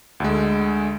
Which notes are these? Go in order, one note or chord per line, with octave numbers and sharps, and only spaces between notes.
D2 D3 G#3